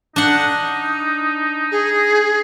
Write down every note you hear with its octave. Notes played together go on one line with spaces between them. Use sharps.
D4 D#4 F#5
G#4